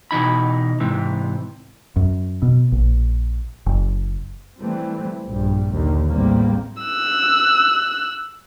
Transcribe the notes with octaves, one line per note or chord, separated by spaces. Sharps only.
B2 E3 D#4 B5
G#2 C3 E3
F#2
B2
A#1
F#1
E3 G3 A3 C4
A#1 G2 G3
D#2 D3
A1 E2 A2 G3 A#3 C4
E6 F#6